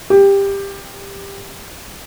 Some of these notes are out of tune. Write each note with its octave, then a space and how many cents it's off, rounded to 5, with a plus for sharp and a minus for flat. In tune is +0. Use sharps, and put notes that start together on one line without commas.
G4 +15